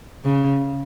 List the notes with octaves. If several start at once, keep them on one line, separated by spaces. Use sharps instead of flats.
C#3